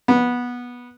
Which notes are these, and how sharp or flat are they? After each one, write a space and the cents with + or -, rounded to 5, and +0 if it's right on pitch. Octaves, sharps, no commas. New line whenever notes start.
B3 -15